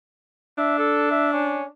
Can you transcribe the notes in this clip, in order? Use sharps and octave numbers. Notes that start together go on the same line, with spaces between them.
D4 E5
A4
E5
C#4